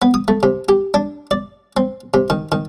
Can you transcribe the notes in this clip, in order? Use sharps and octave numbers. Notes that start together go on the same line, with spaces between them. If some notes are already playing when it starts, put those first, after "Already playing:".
B3
D#6
A3
C3
G4
D4
D5
C4
C3
D#3
D#3